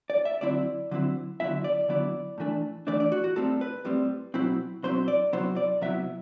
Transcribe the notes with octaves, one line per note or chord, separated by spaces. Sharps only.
D5
E5
D3 F#3 C4 E4 D5
D3 F#3 C4 E4
D3 F#3 B3 E4 E5
D5
D3 F#3 B3 E4 D5
A2 E3 A3 D4
A2 E3 A3 D4 D5
D5
F#4
F#4
A2 G3 C4 A4
B4
A2 G3 C4
B2 F#3 C4 E4
B2 F#3 C4 E4 C5
D5
C3 F#3 B3 E4 C5
D5
C3 F#3 B3 E4 E5